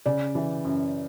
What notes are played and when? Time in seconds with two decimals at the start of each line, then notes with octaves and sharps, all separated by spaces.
0.06 C#3 D5
0.35 E3
0.65 F#2